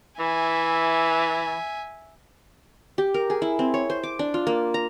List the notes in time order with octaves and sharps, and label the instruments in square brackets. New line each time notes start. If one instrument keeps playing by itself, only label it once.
[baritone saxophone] E3 [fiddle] E5 G#5
[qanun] G4
A#4
G#4
E4
C4
C#5
C5
D6
D4
F4
A#3
A#5